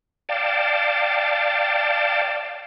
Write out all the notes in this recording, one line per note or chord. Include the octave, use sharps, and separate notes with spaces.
D5 F5 G5 A5